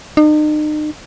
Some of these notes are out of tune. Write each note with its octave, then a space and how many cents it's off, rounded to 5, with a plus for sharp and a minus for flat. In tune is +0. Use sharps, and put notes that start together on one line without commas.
D#4 -40